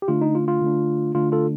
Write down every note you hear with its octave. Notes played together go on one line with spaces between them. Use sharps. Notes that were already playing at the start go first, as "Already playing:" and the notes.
G4
D3 A3 D4 F4
D#4
F4
F4
D3 A3 D4
D3 A3 D4 F4
F4 A4